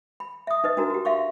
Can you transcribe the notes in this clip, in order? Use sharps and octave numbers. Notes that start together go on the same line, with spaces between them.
B5
E5 D#6
D#4 B4 D#5
D4 D#4 F#4 A#4 A#5
F#4 G4
E5 F5 C6 C#6